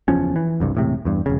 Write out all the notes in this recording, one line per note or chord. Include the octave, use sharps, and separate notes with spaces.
F#1 E2 F3 C#4
E3
F#1 C2 G2
E1 A2 C3
E2 G2
E1 C#3